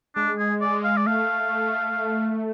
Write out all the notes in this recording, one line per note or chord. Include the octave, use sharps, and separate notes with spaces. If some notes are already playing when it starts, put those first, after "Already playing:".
G#3 D4
G#4
D5
F5
D5
A3 F5